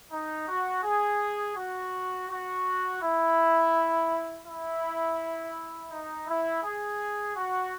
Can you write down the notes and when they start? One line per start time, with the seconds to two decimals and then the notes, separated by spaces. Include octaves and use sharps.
0.12 D#4
0.49 F#4
0.84 G#4
1.57 F#4
2.29 F#4
3.02 E4
4.46 E4
5.91 D#4
6.27 E4
6.64 G#4
7.36 F#4